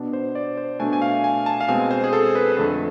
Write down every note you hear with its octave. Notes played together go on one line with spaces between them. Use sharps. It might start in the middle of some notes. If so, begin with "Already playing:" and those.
Already playing: B2 B3 D4
C5
D5
C5
B2 A3 D4 G#5
G#5
F5
G#5
A5
F5
B2 G#3 C4 G#5
C5
G#4
A4
B4
B4
F2 D3 A3 A4